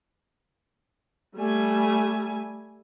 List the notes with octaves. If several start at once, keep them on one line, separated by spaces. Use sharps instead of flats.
G3 A3 G#5